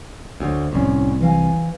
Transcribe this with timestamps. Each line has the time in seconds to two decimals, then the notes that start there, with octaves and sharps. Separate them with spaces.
0.40 D2 C5 C#5
0.73 C2 A2 C#4 D5
1.20 E3 F5 G#5